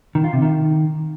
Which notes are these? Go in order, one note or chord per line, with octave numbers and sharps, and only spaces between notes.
D#3
F4
C3
D#3